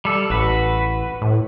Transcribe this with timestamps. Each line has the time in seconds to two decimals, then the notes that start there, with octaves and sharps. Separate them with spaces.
0.05 G3 A4
0.30 A1 F#4 B4
1.22 A2